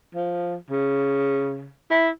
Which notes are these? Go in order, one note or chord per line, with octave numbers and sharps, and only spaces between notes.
F3
C#3
E4